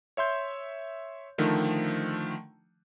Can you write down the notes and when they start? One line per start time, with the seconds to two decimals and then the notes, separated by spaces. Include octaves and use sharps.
0.17 C#5 E5 C6 G6
1.38 D3 D#3 F3 A3